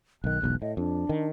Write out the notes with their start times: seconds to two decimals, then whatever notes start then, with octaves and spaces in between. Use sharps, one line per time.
0.24 B1 D#3 F#6
0.42 E1 B1 E2
0.62 A2 D#5
0.77 F2 D4
1.09 D#3